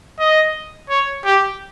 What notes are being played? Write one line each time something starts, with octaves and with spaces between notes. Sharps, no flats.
D#5
C#5
G4